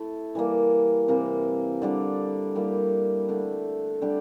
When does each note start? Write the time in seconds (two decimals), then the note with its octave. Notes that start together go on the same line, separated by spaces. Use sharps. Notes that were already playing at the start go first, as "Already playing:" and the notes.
Already playing: A3 E4 A4
0.35 E3 G3 A#3
1.08 C3 E3 A#3 E4
1.82 D3 G3 D4
2.55 G3 A#3 E4 G4
3.28 D3 A3 D4
4.02 D3 G3 D4 G4